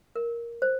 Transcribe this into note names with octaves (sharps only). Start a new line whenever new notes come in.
A#4
C5